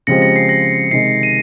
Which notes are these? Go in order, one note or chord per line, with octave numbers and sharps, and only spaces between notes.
C#3 F3 G#3 C4 G4 A#6 C#7
A#6 C#7
C7
A#6
C3 D#3 G#3 C7
D#7